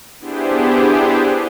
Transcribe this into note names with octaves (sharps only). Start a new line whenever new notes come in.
B3 D4 E4 G4 G#4 C5